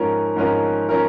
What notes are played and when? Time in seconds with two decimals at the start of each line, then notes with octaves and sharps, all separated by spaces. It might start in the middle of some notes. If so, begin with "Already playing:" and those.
Already playing: G#2 F3 C#4 A#4
0.36 G#2 F3 C#4 A#4
0.89 F3 C#4 A#4